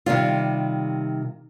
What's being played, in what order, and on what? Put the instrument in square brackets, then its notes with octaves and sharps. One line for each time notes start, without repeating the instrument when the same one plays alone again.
[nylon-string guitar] C3 D#3 G3 F4